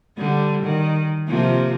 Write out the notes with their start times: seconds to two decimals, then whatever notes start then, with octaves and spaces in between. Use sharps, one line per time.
0.17 D3 G3
0.62 D#3
1.28 C3 F3 A#3